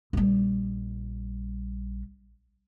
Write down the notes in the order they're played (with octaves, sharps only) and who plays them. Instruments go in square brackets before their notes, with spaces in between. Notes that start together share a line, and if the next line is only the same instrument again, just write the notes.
[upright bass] A#1 G3